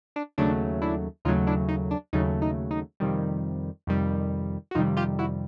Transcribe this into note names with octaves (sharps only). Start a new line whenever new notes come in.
D4
D#2 C#3 F#3 A3 D4
D4 E4
D#2 C#3 F#3 A3 D#4 F4
D4 E4
D#4
D4
D#2 C#3 F#3 A3 D#4
D#4
D#4
F2 C3 D#3 G3
F2 C3 D#3 G3
F#4
F2 C3 D#3 G3 D#4 F4
F4 G4
E4 F#4